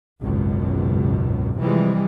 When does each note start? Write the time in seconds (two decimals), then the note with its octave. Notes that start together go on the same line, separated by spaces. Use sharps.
0.21 G#1 C#2 F#2 B2
1.59 C3 E3 F3 G3 G#3